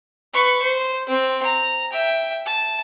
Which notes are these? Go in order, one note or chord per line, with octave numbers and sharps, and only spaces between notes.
B4 C#6
C5
C4
A#5
E5 G5
A5